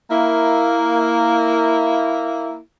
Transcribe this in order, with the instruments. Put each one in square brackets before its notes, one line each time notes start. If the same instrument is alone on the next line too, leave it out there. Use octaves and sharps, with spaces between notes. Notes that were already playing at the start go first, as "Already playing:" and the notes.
[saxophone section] A#3 E4